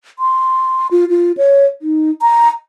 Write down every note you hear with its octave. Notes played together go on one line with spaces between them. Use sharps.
C6
F4
F4
C#5
D#4
A#5